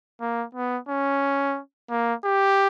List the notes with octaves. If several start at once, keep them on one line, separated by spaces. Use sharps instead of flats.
A#3
B3
C#4
A#3
G4